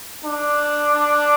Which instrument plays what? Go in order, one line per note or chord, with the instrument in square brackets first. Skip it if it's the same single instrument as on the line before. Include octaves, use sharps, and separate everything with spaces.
[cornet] D4